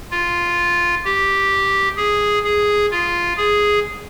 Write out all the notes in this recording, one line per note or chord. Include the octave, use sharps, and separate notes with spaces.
F4
G4
G#4
G#4
F4
G#4